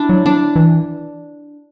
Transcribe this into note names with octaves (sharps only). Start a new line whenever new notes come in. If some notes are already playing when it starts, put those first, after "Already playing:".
Already playing: D4 E4
F#3
D4
E3